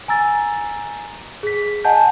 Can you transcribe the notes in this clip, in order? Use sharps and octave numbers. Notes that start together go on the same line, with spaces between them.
G#5 A#5 E6 A6
G#4 B6
D#5 F#5 G#5 A5 G6